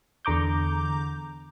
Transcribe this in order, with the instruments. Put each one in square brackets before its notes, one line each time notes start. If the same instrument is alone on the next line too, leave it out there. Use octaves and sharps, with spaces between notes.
[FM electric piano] E2 D3 A#5 D6 G6